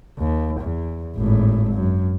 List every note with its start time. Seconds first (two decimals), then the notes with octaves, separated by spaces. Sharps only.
0.18 D#2
0.61 E2
1.16 G#1 A2
1.74 F#2